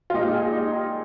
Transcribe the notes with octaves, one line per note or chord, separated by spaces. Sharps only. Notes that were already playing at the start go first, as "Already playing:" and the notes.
F4
A#2 G#3 D#4 G4
F4 G#4
D#4 G4
D#4 G4